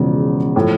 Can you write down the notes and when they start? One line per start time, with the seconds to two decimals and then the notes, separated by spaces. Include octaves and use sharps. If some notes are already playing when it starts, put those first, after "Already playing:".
Already playing: E1 E2 C#3 F3
0.56 A2 F3